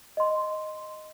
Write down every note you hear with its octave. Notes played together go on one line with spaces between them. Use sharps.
D#5 C6